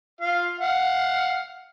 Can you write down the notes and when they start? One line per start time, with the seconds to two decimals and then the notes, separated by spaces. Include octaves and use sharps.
0.21 F4 F5
0.59 F5 F#5